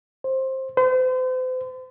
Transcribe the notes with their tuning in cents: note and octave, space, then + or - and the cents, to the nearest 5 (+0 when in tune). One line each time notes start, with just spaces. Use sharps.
C5 +15
C5 -40